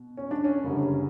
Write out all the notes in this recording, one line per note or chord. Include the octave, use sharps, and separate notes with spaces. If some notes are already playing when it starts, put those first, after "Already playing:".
Already playing: B2
C#4
D4
C#4
F#1 F#2 D3 G3